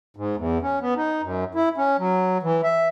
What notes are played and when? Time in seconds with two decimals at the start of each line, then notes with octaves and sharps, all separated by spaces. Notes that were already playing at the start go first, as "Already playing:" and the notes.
0.16 G#2
0.36 E2
0.62 C#4
0.81 B3
0.96 D#4
1.22 F#2
1.55 E4
1.77 C#4
1.99 F#3
2.43 E3
2.64 E5